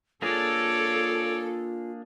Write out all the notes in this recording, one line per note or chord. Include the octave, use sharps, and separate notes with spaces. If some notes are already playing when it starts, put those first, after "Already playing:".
A#3 D4 F4 G#4 A4 C#5 D5